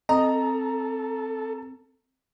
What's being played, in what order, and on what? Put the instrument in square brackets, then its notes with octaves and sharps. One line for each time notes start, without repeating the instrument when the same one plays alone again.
[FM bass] C4 [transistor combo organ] A4 [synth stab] D#5 [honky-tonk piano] A#5